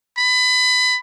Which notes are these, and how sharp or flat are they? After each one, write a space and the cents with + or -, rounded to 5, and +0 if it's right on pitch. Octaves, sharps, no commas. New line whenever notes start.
B5 +25